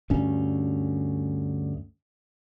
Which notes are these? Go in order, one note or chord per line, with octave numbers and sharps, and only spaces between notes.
D2 G2 C#4